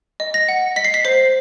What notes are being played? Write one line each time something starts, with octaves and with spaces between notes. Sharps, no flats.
D#5
A#6
F#5
D#5 B6
C7
B6
C5 C7